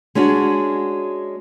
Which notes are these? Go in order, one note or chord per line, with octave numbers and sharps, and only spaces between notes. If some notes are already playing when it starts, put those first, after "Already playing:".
G#3 C#4 D4 F#4